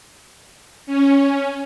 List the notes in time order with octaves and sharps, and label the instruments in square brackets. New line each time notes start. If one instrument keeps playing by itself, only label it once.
[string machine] C#4